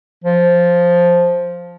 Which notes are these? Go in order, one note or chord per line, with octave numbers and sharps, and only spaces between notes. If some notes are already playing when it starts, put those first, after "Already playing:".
F3